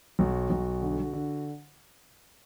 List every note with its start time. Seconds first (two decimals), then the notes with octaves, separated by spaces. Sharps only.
0.19 B1 F#4
0.50 B1
0.82 D3
1.13 D3